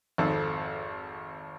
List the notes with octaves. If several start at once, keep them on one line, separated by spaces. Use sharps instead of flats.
G#1 F2 A4